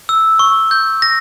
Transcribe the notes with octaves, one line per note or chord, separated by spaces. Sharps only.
E6
C#6
G6
A#6